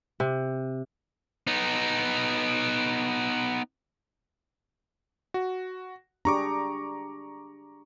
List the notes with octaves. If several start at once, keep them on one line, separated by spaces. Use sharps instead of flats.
C3
B3 D#4
F#4
D4 G4 G#4 A#5 C#6 D6